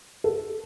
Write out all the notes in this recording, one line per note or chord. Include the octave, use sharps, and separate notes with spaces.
A4